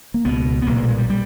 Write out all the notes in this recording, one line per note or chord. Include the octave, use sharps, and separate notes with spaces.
A#3
C#2 B2 B3
B3
B1 A#2 A#3
A#3
G3
G#3
G3
G3